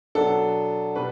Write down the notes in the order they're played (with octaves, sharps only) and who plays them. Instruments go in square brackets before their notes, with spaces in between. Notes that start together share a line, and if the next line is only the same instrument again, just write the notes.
[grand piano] B2 F#3 B3 D4 A4
B2 G3 B4